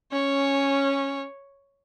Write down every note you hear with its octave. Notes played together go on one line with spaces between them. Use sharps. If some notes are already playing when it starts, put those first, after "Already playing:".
C#4 C#5